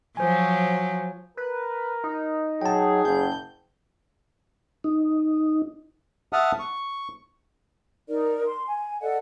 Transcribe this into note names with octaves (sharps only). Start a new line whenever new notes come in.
F3 F#3 C5 G#5
A#4 B4
D#4
F#3 G#4 G5 A5
F#1 G6
D#4
E5 F#5 A5 D#6 F6
C#6
D#4 A#4 D5
C6
G#5
A4 D5 D#5 F#5